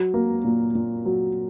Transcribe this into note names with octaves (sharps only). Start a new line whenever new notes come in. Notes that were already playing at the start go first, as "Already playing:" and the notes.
Already playing: F#3
A#3
A#2
A#2
F#3